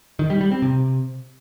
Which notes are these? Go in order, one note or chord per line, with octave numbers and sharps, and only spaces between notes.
D#3
G3
G3
C4
C3